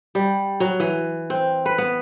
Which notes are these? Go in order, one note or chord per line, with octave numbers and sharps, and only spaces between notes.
G3
F#3
E3
C4
B4
B3